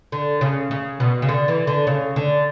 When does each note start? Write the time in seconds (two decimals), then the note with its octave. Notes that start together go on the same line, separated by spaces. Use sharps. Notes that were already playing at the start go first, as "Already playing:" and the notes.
0.12 D3
0.41 C#3
0.71 C#3
1.00 B2
1.22 C#3
1.29 D3
1.48 E3
1.67 D3
1.87 C#3
2.16 D3